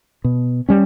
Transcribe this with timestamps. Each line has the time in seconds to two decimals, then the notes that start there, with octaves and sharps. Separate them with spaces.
0.24 B2
0.69 G3 C#4